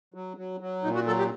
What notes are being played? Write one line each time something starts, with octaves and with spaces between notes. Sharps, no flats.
F#3
F#3
F#3
A#2 D#4
F#4
F#3 A4
G4